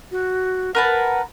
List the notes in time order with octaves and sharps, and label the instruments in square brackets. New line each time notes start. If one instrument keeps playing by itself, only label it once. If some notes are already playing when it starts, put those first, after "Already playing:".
[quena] F#4
[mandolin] A#4 B4 A5 [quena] F#5